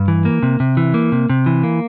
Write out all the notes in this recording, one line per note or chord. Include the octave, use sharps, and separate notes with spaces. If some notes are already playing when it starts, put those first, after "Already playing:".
Already playing: G2
E3
A#3
C3
C3
E3
A#3
C3
C3
E3
A#3